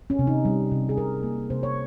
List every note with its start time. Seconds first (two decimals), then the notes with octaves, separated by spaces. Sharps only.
0.10 C#4
0.19 C3
0.27 D#4
0.45 G3
0.71 C3
0.89 G#4
0.97 C3 A#4
1.23 A#3
1.50 C3 C5
1.63 C#5